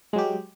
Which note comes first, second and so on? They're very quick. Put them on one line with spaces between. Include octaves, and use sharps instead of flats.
G#3 F#3 G4